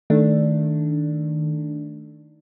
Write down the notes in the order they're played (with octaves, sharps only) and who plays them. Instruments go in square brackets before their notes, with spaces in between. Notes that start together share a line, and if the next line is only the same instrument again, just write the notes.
[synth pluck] D#3 A3 D4